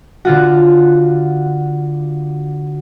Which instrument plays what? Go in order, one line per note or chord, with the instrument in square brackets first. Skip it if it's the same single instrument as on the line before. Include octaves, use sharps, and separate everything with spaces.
[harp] D3 F4 F#4